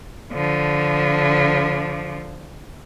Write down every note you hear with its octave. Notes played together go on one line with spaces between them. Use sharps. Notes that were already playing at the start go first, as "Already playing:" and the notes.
D3 F3